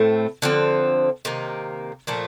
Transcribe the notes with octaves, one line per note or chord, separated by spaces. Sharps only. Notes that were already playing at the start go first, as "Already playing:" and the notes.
Already playing: A2 A3 C4
D3 F3 C4
C3 D#3 A#3
A#2 F3 A3